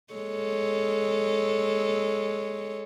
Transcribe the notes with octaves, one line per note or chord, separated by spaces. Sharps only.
G#3 A4 C#5